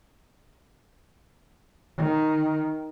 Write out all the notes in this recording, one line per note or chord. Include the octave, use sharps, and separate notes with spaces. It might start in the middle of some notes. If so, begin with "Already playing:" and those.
D#3